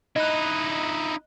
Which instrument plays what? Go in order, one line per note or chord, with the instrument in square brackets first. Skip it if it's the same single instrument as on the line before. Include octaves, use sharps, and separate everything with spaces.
[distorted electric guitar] D#4 E4 [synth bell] D#5 F#6